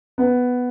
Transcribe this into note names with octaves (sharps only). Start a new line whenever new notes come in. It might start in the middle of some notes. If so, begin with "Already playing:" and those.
B3